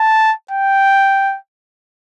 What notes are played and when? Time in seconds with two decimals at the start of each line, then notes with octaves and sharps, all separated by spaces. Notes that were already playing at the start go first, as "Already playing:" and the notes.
Already playing: A5
0.51 G5